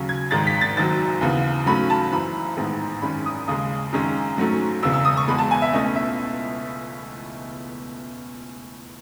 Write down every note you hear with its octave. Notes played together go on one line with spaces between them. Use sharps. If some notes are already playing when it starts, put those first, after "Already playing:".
Already playing: D#2 C#3 F#3 C#4
G#6
G#1 G#2 D#3 G#3 A6
B6
A6
F#1 F#2 D#3 F#3 A6
D#2 C#3 E3 B3
G#2 F#3 A3 C#4 B5
A5
F#1 F#2 E3 B5
A1 G#2 D#3 G#3 B3
G#1 F#2 D#3 G#3 C#4 B5
D#6
D#2 C#3 G#3 D#6
F#2 D#3 G#3 C#4
G#2 F#3 A3 C#4
E1 E2 C#3 E6
E6
D#6
C#6
E2 B2 G#3 B5
A5
G#5
E5
C#2 B2 A3 C#4 D#5
E5